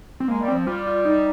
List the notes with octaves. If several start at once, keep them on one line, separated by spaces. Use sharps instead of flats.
C4
G#3 A#3
G3
F3 C4
G3 F4
F4
D#4